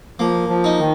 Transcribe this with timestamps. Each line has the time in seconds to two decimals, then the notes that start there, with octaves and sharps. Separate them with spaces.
0.19 F3 A#3
0.49 F3
0.64 D#4
0.79 D#3